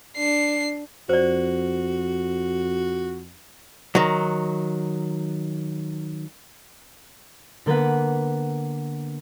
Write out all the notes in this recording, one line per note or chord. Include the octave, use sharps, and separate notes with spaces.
D4 C7
F2 F#4 C5 D5
D#3 F#3
D3 A#3 B3 B4 F#5